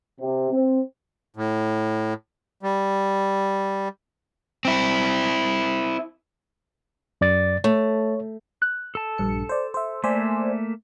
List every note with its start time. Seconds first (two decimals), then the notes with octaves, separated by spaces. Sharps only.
0.21 C3
0.51 C4
1.36 A2
2.63 G3
4.65 C4 E4
7.21 F#2 D5 A6
7.64 A3 C#5
8.62 F#6
8.95 A4 A5
9.18 A#1 G2 C#7
9.49 C5 D5
9.74 C5 E5
10.04 A3 A#3 C5 D5 E5 G#5